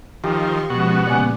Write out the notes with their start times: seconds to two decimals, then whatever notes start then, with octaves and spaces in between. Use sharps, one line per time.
0.24 D#3 F3 G4 F5 C6 C#6 E6
0.70 B2 F3 G#3 C#4 F#4
1.06 A#2 C#3 B3 D5 G#5